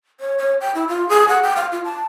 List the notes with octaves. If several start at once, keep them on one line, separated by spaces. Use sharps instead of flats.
C#5
C#5
G5
E4
F4
G#4
F#5
G5
F5
F4
A5